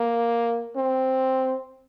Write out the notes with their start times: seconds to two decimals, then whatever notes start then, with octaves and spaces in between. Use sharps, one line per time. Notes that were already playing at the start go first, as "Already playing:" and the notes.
Already playing: A#3
0.76 C4